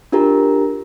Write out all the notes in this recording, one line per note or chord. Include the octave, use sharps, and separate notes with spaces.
D4 F4 G4 A#4 A#5